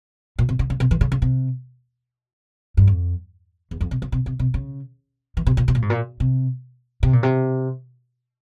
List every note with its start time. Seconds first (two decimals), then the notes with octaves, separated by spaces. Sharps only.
0.39 A#2
0.49 C3
0.59 C#3
0.70 C#3
0.80 C3
0.91 E3
1.01 C#3
1.12 C#3
1.22 C3
2.77 G2
2.87 F2
3.71 E2
3.81 F2
3.91 C3
4.02 C#3
4.12 C3
4.26 C3
4.39 C3
4.54 C#3
5.37 E3
5.47 C3
5.57 A#2
5.68 C3
5.75 A#2
5.82 G#2
5.90 A#2
6.20 C3
7.03 C3
7.13 A#2
7.23 C3